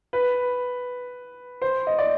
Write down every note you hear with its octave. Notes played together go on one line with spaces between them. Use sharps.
B4
C5
D#5
D5